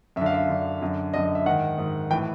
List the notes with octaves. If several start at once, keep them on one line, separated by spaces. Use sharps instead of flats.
F#2 E5
D3 F5
E5
F#2 D3
F#2 D3
F#2 D3 D#5
D#5
E5
G#2 D#3 F#5
G#2 D#3
A2 E3 G5